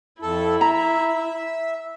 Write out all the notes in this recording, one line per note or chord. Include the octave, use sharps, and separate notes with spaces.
F2 E4 A4
E5 A#5